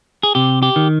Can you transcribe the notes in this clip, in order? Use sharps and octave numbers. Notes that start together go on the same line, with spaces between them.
G#4
C3 G4
G4
D#3